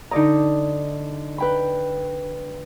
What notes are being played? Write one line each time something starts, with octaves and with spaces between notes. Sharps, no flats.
D3 D#4 D5 D#5 A#5
B4 G5 B5